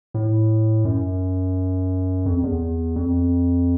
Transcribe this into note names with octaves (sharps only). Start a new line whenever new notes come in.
A2
F#2
F2
E2
F2